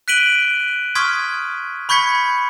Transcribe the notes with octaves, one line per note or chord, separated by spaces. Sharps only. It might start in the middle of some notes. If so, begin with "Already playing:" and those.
F#6 B6 D7 D#7 F#7 G7
C6 C#6 D#6 F6 G#6 B6
B5 C#6 G6 G#6 B6 C#7